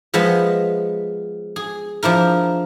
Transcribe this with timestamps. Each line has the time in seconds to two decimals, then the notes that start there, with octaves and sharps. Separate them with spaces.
0.14 F3 G#3 B3 D#5 E5
1.56 G#4
2.03 F3 D4 E4 A#4